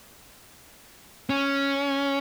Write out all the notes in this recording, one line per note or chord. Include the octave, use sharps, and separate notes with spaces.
C#4